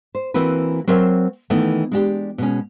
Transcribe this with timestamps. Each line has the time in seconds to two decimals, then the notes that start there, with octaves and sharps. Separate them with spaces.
0.15 C5
0.34 E3 A#3 C4 F#4 B4
0.87 F#3 C4 A#4 C5 E5
1.50 D#3 E3 A3 B3
1.92 G#3 D4 G4
2.38 B2 G#3 C#4